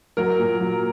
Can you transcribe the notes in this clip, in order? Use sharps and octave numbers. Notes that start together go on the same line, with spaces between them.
F#3 A#4
A#2
F#3